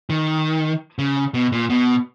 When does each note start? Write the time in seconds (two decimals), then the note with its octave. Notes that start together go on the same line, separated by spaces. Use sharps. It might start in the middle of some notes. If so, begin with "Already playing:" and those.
0.10 D#3
0.99 C#3
1.34 B2
1.52 A#2
1.70 B2